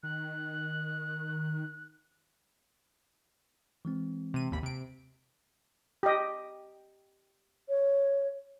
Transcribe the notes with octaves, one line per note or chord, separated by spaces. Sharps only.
D#3 F#6
E3 G#3 C4
C3 D#7
G#1 D#2 B5
C3 D7
G4 D#5
C#5